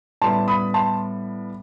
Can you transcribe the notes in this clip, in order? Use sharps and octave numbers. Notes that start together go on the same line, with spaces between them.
A2 G3 B3 A5 C6
B5 D#6
A5 C6